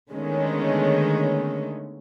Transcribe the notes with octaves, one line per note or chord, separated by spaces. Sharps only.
D3 D#3 G#3 A3 B3 C#4